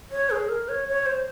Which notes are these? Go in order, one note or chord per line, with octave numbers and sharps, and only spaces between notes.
C#5
G#4
A#4
C#5
C#5
C5